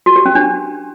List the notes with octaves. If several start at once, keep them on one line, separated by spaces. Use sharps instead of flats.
F#4
G4
C#4
D4